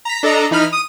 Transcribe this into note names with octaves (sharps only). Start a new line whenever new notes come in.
A#5 B6
D4 A4 D#5 A#5
E3 D#4 B5 F6
D#6 D#7